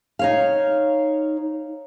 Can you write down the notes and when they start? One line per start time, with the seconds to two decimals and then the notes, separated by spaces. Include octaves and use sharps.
0.19 D#4 C#5 F5